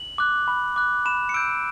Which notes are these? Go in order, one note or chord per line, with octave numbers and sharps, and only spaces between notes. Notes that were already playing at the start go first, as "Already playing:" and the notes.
Already playing: F#7
D6 F#6
B5
D6 F#6
B5 E7
C#7
E6 G6 D7